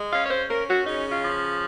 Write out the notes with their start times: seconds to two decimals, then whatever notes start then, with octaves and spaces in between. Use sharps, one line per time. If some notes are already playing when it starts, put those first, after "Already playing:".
Already playing: G#3
0.12 C#4 F5
0.25 C#5
0.31 C5
0.49 C#4 A#4
0.68 F#4
0.86 C#3 D#4
1.11 F4
1.24 F3